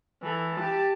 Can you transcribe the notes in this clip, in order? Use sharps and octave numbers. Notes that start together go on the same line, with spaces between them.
E3 A4
G4 A5